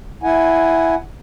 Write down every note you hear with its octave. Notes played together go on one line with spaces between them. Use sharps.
E4 F#5 G#5